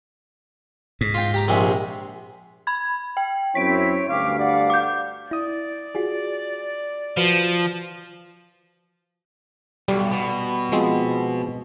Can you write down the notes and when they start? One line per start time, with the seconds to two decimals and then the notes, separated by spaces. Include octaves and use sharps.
1.01 G#2
1.14 F4 G5
1.34 G4 A#5 D6
1.48 A#1 C3 G#3
2.67 B5 G#6
3.17 G5
3.55 F#2 C4 E4 C#5 B6 D7
4.09 D2 G2 F5 G5 C#6 D6
4.39 D5 F5 F#5
4.70 D6 G6
5.31 E4 D5 D#6
5.95 F4 F#4 G#4
7.17 F3 F#4 B4
9.88 B1 G3
10.12 B2
10.72 F3 G#3 C4